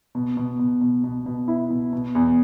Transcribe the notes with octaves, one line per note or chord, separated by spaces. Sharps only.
B2
B2
B2
B2
B2
B2
E4
B2
B2
E2